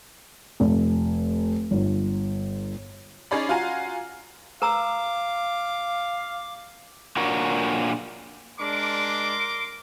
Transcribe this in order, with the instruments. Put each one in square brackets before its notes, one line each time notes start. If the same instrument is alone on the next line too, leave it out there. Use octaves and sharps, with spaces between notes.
[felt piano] F1
G1
[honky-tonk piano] C#4 D#4 G#4 C#5 D5 B5
F4 F#4 F5 G#5 A#5
[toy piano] B4 A#5 E6 [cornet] F5 [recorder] D6
[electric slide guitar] A#2 D4 F#4 A#4 C#5
[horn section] G#3 D4 [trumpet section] A#4 C6 D6